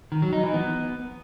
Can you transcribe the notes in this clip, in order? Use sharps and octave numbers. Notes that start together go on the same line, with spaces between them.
D#3
F#3
D#4
E3
B3